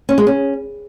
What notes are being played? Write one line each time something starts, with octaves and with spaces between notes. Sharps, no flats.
C#4
G#3
C#4